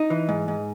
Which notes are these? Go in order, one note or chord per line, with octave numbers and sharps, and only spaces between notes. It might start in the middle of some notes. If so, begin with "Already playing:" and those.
Already playing: D#4
E3
G#2
G#2